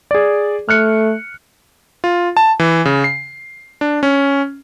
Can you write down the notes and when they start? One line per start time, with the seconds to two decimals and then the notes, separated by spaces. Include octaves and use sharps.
0.11 G#4 D5
0.69 A3 F6 F#6 C#7
2.04 F4
2.37 A5
2.59 E3
2.85 C#3
3.04 C7
3.81 D4
4.03 C#4